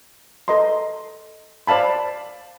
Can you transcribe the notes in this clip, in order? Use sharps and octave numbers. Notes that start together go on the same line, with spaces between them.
A4 B4 D#5 A#5 C6
C5 D5 F5 A5 B5